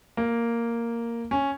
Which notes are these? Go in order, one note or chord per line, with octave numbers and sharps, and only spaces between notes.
A#3
C#4